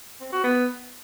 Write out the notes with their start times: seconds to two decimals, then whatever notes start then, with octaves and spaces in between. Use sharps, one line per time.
0.21 C4
0.32 F#4
0.44 B3